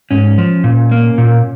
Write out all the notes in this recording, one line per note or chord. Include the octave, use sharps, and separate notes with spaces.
G#2 C#4
F3
A#2
A#3
A#2